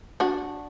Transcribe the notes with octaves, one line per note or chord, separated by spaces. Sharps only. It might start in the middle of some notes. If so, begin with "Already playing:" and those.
D4 F#4